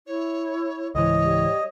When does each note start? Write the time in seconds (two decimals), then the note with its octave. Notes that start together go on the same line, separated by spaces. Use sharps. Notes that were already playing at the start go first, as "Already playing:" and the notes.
0.07 E4 C#5
0.95 C#2 G#2 E3 C#5 D#5
1.20 G3